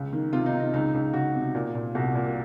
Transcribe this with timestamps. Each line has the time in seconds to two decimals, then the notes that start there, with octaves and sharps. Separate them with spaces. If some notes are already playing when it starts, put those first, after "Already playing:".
Already playing: C#2
0.13 D#3
0.33 C3 F4
0.46 D#4
0.53 C3
0.60 D#4
0.73 C#2 D#4
0.94 C#2
1.13 C#2 F#4
1.35 C3
1.55 A#2
1.75 A#2
1.95 C2 F#4
2.15 A#2